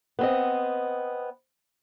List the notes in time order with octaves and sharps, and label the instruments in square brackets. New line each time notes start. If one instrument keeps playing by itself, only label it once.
[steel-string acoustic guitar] B3 C4 D#5